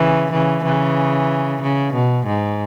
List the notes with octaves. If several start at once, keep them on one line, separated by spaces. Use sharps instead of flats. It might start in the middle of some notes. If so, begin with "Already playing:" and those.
Already playing: C#3 E3
C#3 E3
C#3 E3
C#3
B2
G#2